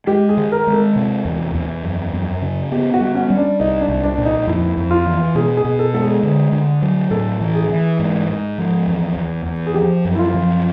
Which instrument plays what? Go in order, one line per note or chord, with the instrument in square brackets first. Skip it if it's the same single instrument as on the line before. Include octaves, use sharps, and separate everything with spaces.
[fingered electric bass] G#3 [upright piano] G4
[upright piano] G#4
[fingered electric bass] D#3
[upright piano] A#4
[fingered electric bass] G#3
[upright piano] A4
[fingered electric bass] C3
E2
E2
F#2
F#2
C#3
[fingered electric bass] B3 [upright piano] G4
[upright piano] F#4
[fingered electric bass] G3
[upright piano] C#4
[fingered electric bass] G3
[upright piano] D4
[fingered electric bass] C2 [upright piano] D#4
[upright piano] D4
[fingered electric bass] C2
[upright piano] D4
[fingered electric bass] A#2 [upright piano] D4
[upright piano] D#4
[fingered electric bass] F2 [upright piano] E4
[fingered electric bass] F2
[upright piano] F4
[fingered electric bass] E3
[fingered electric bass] B2 [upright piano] G#4
[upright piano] G#4
[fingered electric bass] B2
[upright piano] A4
[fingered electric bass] G#3 [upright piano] A4
[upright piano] G#4
[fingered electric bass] D3
D3
F#3
[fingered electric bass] A2 [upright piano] A4
[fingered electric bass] E3
[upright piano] G#4
[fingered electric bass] E3
G#2
G#2
F3
E2
E2
E2
[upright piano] G#4
[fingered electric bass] F3 [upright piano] G4
[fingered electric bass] F#2
[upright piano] E4
F4
[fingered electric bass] F3